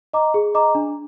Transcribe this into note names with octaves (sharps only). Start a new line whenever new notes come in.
D#5 A#5 D6
G#4
D#5 A#5 D6
D4